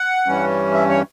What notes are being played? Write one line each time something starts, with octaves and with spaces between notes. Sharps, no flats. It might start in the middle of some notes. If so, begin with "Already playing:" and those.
Already playing: F#5
G2 E3 G3 C#4
E5
C#5